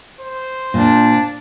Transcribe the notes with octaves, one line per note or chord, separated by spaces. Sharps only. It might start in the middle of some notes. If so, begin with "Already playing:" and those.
C5
A#2 D4